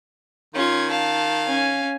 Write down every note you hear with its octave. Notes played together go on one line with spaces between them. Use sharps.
D#3 C#4 F4 G#6
F5 A5
C#4 G#5